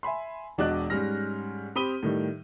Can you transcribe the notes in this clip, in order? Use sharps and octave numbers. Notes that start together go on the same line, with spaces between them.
E5 G#5 B5 C6
E1 D4 F#4 D5 D#5 F#6
G#2 G3 C#4 F6 A#6
C4 G4 B5 D#6 D#7 G7
A2 D#3 G3